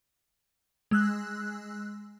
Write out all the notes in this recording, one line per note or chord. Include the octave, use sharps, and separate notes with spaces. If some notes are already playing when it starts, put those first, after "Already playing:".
G#3 E6 F#6